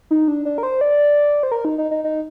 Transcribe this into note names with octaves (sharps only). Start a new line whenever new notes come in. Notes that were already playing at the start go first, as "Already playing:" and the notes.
D#4
D4
D4
A#4
C5
D5
C5
A#4
D#4
D#4
D#4
D#4